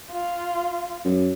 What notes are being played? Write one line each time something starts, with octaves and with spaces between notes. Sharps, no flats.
F4
F#2